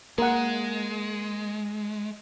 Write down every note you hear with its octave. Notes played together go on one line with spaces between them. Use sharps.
G#3 A#3 A#4 F#5